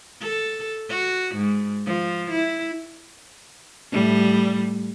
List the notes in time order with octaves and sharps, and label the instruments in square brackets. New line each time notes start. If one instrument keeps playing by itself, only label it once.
[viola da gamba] A4
F#4
G#2
F3
E4
A2 G3